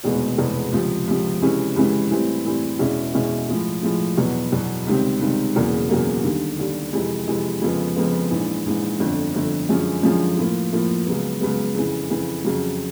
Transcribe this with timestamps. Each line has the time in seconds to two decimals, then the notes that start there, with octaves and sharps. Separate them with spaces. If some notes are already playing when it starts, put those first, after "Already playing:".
0.04 F1 E2 B2 G#3 B3
0.38 F1 E2 B2 G#3 B3
0.72 C#2 C3 F3
1.07 C#2 C3 F3
1.42 C#2 C3 E3 G#3 C#4
1.76 C#2 C3 E3 G#3 C#4
2.10 A2 E3 G3 C4
2.45 A2 E3 G3 C4
2.79 E2 B2 G#3 C#4 E4
3.14 E2 B2 G#3 C#4 E4
3.48 A2 F3 G#3
3.83 A2 F3 G#3
4.17 E2 B2 F#3 B3
4.52 E2 B2 F#3 B3
4.87 C#2 C3 D#3 G3 C4
5.21 C#2 C3 D#3 G3 C4
5.55 E1 E2 C#3 F#3 A#3
5.90 E1 E2 C#3 F#3 A#3
6.24 D#2 D3 G3
6.59 D#2 D3 G3
6.93 F2 C3 E3 G#3
7.27 F2 C3 E3 G#3
7.62 F2 C#3 F3 G#3 B3
7.96 F2 C#3 F3 G#3 B3
8.31 A#1 G#2 E3
8.66 A#1 G#2 E3
9.00 G1 F2 D3
9.34 G1 F2 D3
9.69 F#2 D3 F3 G#3 C#4
10.03 F#2 D3 F3 G#3 C#4
10.38 A2 F3 A#3
10.72 A2 F3 A#3
11.07 C#2 C#3 F#3 B3
11.41 C#2 C#3 F#3 B3
11.75 F2 C#3 E3
12.10 F2 C#3 E3
12.44 F2 C#3 F#3